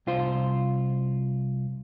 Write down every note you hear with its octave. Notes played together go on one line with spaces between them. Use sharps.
C2 F4 C5